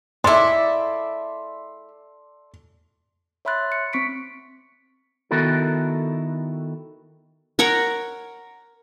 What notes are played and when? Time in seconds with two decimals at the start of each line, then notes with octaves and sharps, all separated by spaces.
0.24 G#3 E4 A4 D5 E5 C6
3.45 C#5 E5 B5 C6 F#6 A6
3.72 C#7
3.93 C4 C#6 B6 C#7 D7
5.31 D#3 B3 E4 F#4 A4 A#4
7.59 A#4 C#5 F#5 A#5